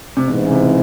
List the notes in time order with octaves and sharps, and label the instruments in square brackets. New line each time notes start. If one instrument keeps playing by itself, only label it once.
[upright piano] C3
[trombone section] A1 G#2 E3 [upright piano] B2
[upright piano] C#3
C3